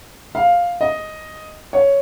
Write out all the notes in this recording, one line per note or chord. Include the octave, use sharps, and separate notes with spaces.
F5
D#5
C#5